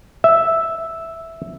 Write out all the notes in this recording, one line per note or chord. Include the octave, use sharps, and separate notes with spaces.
E5